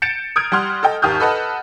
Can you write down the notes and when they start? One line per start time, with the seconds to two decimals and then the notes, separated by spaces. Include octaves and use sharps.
0.02 G6 A6 C#7 D7 E7
0.36 D#6 F6 G6 G#6 D7
0.52 G3 F#5 C6 F6
0.83 A4 D#5 G5
1.02 G#1 D#2 G4 D#6 F6 G6
1.20 A4 B4 D#5 F#5 A5